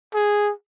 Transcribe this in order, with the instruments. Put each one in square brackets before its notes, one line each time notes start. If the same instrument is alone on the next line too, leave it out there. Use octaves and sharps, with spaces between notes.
[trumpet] G#4